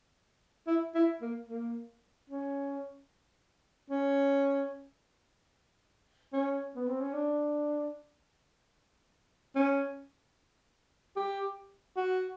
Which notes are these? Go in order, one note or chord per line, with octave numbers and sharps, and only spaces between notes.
E4
E4
A#3
A#3
C#4
C#4
C#4
B3
C4
C#4
D4
C#4
G4
F#4